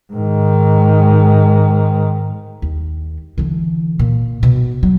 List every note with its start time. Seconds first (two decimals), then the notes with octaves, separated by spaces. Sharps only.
0.13 G#2 D#3
2.62 D#2
3.38 D3 E3
3.99 A#2
4.43 B2
4.83 F#3